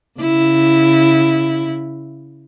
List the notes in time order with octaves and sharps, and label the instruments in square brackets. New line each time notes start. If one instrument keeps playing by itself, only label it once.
[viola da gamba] C#3 E4